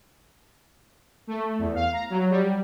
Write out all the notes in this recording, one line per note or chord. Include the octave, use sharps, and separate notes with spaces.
A3
E2
F5
A#5
F#3
G3